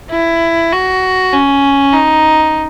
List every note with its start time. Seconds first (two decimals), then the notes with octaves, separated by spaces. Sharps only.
0.11 E4
0.73 F#4
1.32 C#4
1.93 D#4